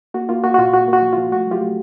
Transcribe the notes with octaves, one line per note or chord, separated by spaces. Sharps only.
A#3 F#4
A#3 F4
A#3 F#4
F#4
A#2 F4
A#2 F#4
A#3
F#4
F3
F3 F4
A3 F#4
F#3 F4 G4
A3